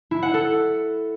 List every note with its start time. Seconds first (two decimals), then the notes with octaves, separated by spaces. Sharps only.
0.11 E4
0.23 F#5
0.34 A4